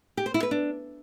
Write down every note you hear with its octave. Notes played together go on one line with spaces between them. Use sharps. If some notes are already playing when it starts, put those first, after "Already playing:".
G4
C5
E4
B4
D4